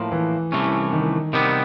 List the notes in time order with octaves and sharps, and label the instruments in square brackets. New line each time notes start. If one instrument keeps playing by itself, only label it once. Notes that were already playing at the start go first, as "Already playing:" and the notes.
Already playing: [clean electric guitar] A2 F3 A#3
[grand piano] E3
[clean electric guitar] C2 C3 E3 A3 C#4
[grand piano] D#3
[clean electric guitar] C3 D#3 G3 B3